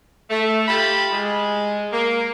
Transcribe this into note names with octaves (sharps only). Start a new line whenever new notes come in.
A3
F4 G4 G5 A5 B5
G#3
A#3